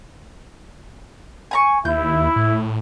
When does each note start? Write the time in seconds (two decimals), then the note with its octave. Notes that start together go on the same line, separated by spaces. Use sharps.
1.51 G#5 A#5 C#6
1.85 D#2 E4 G6
2.36 A2